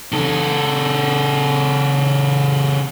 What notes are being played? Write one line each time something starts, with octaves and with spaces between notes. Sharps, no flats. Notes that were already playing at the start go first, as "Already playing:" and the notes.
C#3 A4